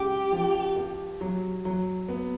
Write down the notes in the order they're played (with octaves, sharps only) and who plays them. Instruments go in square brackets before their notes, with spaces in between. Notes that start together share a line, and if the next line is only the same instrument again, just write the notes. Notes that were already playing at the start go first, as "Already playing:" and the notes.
Already playing: [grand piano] C#3 G#3 [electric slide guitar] G4
[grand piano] F3
G4
F#3
F#3
B3